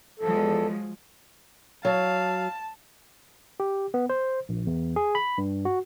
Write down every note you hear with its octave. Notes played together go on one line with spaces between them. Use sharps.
E2 F3 F#3 G#3 A4
F#3 F5 A5
G4
B3
C5
A#1
E2
G#4
B5
G2
F#4